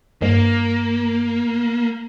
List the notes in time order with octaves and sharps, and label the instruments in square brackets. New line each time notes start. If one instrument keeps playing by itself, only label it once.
[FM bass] G2 [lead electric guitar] A#3